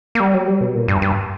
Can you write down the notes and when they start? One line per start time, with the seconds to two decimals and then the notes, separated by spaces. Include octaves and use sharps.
0.15 A#3
0.20 G3
0.34 F#3
0.47 G3
0.61 B2
0.75 A#2
0.88 G2
1.02 G2